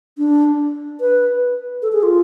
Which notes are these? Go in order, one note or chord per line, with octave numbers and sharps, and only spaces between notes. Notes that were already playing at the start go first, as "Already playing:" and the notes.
D4
B4
A4
G#4
F4